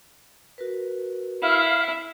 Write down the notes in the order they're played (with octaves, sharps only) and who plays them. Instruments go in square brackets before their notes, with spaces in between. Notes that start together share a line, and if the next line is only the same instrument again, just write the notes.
[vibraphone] F#4 A#4 B4
[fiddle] E4 [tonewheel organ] F5